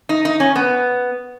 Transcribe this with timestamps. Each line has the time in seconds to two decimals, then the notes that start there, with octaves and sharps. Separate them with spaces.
0.09 D#4
0.25 D#4
0.40 C#4
0.56 B3